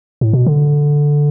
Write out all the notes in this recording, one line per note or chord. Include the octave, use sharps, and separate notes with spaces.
A2
B2
D3